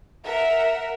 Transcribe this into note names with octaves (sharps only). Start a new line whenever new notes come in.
A#4 E5 F#5